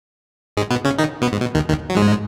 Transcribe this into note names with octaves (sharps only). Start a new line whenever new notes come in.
G#2 G#3
B2 B3
C#3 C#4
D#3 D#4
B2 B3
G#2
B2
D#2 D#3
D#2 D#3
F#3
G#2 G#3